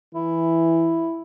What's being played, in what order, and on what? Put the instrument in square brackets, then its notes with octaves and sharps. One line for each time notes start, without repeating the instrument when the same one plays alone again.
[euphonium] E3 [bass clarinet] E4